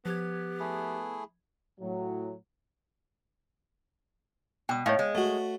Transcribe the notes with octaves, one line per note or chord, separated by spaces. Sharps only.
F3 B3 G4 G#6
A3 E4 G#4
A2 F#3
B2 G5 D#6
A2 C#5 D#5 F5
G#3
A3 F#4